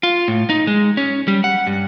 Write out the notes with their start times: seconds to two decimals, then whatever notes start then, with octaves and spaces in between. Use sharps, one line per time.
0.03 F4
0.28 A2
0.50 D#4
0.67 G#3
0.97 C#4
1.28 G3
1.44 F#5
1.67 G2